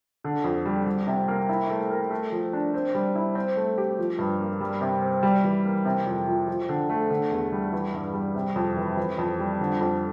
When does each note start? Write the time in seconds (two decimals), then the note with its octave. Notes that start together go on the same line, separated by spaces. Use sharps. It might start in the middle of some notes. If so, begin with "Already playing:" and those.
0.24 D3
0.44 F2
0.65 G3
0.86 G3
1.07 C3
1.28 A#3
1.49 E4
1.70 A3
1.90 A#4
2.10 A3
2.32 F3
2.53 D4
2.74 C4
2.94 G3
3.15 E4
3.35 C4
3.57 A3
3.78 G4
3.99 F3
4.18 G2
4.40 A#3
4.60 G3
4.81 C3
5.02 C4
5.23 G3
5.44 E3
5.65 A#3
5.85 C3
6.06 F2
6.27 F3
6.48 F3
6.69 D3
6.89 A3
7.10 D3
7.31 E2
7.52 G3
7.72 E3
7.93 G2
8.14 G3
8.35 C3
8.56 F2
8.77 E3
8.97 E3
9.18 F2
9.39 G3
9.60 D3
9.80 F2